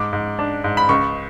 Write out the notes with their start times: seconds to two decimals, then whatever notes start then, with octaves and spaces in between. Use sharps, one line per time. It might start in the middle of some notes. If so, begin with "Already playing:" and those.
Already playing: G#2 D6
0.13 G#2
0.39 D4
0.64 G#2
0.77 B5
0.89 C#2 C#6